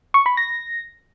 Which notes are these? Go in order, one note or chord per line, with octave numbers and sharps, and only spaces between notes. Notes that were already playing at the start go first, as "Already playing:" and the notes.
C#6
B5
A#6